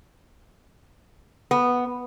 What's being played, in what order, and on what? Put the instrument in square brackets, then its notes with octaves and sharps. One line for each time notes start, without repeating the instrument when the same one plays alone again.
[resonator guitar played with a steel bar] B3